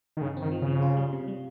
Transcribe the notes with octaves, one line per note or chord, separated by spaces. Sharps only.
D#3
G2 C#3
C4
D#3
F3
C#3 F3
F4
G3
C3
G3